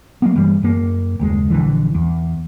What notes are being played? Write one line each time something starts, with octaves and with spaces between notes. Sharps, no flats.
F#3 A#3 B3
G2 E3 G3
F#2 A#3
F#1 D#2 G#3
A#1 D3 E3
E2